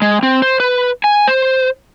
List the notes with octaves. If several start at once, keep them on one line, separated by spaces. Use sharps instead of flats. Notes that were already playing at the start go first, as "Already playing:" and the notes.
G#3
C4
C5
B4
G#5
C5